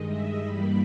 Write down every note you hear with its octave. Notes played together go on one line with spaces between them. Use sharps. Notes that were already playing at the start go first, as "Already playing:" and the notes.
Already playing: G2 D#3 G#3 D#5
E5
G2 E3 G3 A#3 B5